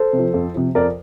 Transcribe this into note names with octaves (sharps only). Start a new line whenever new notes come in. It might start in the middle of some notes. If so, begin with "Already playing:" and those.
Already playing: A4 C5
C3
F3
F2
C3 F3
F2 A#4 D5